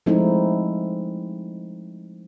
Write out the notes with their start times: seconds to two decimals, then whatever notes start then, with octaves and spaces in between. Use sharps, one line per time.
0.06 F3 G#3 A3 C4 D#4 E4